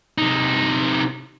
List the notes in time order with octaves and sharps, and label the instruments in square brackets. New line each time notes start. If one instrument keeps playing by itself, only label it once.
[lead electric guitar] C3 D#4